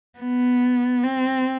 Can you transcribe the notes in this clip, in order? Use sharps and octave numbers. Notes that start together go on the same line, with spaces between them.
B3
C4